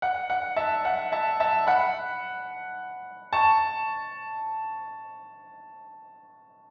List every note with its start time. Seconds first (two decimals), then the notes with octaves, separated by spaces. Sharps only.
0.02 F#5
0.30 F#5
0.56 E5 A5
0.85 F#5
1.12 E5 A5
1.40 E5 A5
1.67 F#5 B5
3.33 A5 C#6